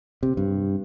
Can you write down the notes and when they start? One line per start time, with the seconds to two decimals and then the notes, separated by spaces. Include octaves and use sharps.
0.23 C3
0.37 G2